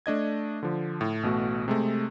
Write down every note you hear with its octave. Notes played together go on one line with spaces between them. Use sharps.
A3 D4 D#5 G#6
D3 F3
A2
A1 B2 A3 F#4
C3 G#3 A3